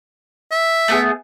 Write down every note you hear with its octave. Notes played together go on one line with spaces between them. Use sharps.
E5
A3 B3 G#4